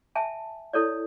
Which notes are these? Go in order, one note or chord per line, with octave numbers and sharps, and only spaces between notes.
E5 G#5 A5
E4 A4 C#5 D5